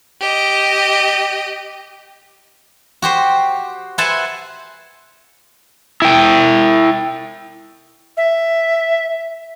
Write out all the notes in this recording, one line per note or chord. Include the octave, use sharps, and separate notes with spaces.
G4 D#5
F#4 G4 C5
B4 C5 E5 F#5 G#5 A5
E4 G5
E5